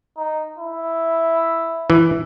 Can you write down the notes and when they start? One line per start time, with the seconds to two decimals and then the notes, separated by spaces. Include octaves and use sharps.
0.17 D#4
0.58 E4
1.90 E3